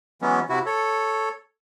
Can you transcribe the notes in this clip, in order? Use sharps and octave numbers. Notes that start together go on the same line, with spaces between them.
E3 F#3 G#3 B3 C#4
C3 E4 F#4
A4 C#5